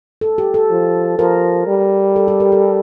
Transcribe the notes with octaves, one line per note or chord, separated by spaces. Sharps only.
A4
G4
A4
F3
F3 A#4
G3
A4
G4
A#4
A4